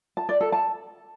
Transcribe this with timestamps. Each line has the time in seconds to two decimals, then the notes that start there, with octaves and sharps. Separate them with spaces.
0.17 A5
0.29 D5
0.41 A4
0.52 A5